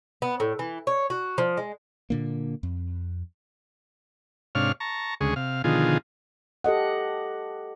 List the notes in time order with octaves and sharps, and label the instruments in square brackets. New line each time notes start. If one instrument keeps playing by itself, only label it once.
[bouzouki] B3
A2
E3
C#5
F#4
F3
G#3
[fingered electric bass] A#2 D3 A#3
F2
[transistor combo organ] G#2 C3 D4 C#5 F5 F6
A5 A#5 C#6
D2 C#3 G#3 G#4 C#6
C3 F5
B2 D3 D#3 F3 F4 G#4
[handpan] G4 A4 D#5 F#5